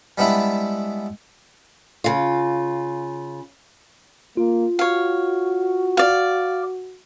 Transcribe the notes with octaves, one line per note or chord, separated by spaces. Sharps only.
G3 G#3 B3 D4 E4 E5
C#3 F4
A#3 F4
F#4 C#5 F5
D5 F5